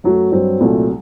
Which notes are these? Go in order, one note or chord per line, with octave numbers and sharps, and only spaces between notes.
F#2 F#3 A3
G2 F#3 C4
C2 A#2 F#3 A3